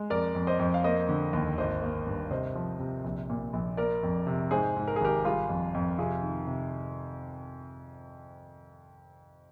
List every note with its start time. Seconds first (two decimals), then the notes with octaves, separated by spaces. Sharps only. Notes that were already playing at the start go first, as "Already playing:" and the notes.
Already playing: G#3
0.10 F2 A#4 D5
0.35 F2
0.47 C5 D#5
0.59 F2
0.74 F5
0.84 A#3 C5 D#5
1.09 D3
1.33 D#2
1.58 G#1 C5 D#5
1.82 A#3
2.07 G2
2.31 C3 C5 D#5
2.55 F3
2.79 C3
3.04 A#1
3.30 A#2
3.53 A#1
3.77 A#3 A#4 D5
4.03 F2
4.27 C3
4.51 G#2 G#4 C5
4.76 G#2
4.88 A#4
4.96 G#4
5.01 G#1 G4 A#4
5.25 G3 F4 G#4
5.49 F2
5.74 F2
5.98 C3 F4 G#4
6.22 D#3
6.47 C3